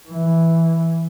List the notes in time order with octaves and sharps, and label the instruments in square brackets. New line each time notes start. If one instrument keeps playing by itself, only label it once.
[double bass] E3